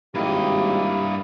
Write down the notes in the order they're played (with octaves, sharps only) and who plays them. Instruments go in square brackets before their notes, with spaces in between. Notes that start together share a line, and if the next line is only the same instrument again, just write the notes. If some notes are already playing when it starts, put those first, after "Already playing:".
[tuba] G#1 [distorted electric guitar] G2 D#5 [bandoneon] A#3 E4 [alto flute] G4